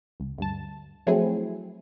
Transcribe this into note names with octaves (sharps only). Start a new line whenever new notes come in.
C#2
D2 G2 A5
F3 F#3 A3 C4 E4 G#4